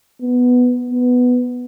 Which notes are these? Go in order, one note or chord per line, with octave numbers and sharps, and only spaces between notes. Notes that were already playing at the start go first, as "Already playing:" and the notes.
B3
B3